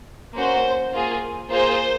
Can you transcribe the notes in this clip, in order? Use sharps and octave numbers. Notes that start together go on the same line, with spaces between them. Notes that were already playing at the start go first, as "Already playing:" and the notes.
A#3 C#4 F#4 C5
A#3 F4 G#4
A#3 F4 G#4 C5